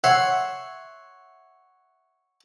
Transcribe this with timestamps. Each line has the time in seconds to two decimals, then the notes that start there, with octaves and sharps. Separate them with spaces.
0.04 C#5 E5 F#5 C6